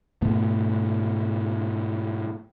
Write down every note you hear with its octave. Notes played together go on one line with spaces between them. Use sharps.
G#2 B2 A3 B3